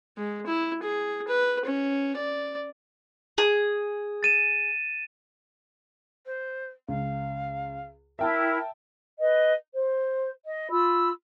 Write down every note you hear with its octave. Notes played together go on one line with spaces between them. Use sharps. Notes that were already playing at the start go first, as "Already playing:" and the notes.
G#3
E4
G#4
B4
C#4
D5
G#4
A6 D#7 E7
C5
C#2 F5
E4 A#4 E5 G5 A5
B4 D#5
C5
D#5
F4 B5 E6